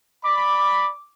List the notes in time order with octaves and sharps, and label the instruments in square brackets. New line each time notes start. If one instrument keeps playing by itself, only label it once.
[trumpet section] D5 B5 [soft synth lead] D6